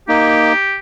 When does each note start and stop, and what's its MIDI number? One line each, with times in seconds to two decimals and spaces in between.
0.09 0.53 58
0.09 0.53 63
0.09 0.79 67